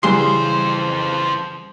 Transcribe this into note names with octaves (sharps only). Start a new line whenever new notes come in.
F2 C#3 E3 G3 G#4 C5 C6